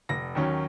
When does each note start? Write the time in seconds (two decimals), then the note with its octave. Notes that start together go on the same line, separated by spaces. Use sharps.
0.09 F1 A#6
0.35 D#2 D#3 F#3 C#4